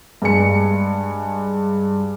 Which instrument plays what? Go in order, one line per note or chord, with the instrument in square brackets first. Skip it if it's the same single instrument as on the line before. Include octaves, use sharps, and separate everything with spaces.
[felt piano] G2 G#3 G#5 C#7